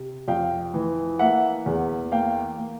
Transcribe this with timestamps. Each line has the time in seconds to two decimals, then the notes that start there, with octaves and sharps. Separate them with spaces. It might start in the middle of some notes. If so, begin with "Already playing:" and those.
Already playing: C3
0.28 F2 F5 G5
0.74 E3
1.19 A#3 E5 F#5
1.66 E2
2.12 A#3 F5 G5
2.58 A#3